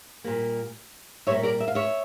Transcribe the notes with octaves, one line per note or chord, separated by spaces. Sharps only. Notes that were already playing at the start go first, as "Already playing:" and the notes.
A#2 G3 A#3
A#2 G3 A#3 C#5 E5
A#4 D5
E5
F5
C#5 E5